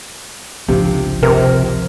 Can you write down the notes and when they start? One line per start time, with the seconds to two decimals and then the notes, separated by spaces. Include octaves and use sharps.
0.68 G#1 C#2 C3 F3 D4
1.23 C3 A#4